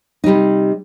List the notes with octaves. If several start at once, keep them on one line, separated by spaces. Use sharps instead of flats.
C3 G3 D#4